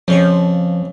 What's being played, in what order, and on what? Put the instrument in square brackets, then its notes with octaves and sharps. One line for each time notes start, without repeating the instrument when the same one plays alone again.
[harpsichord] F2 C#3 C#6 [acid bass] F3